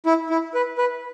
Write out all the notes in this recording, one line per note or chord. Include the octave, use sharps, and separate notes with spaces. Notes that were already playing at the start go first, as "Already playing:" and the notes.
E4
E4
B4
B4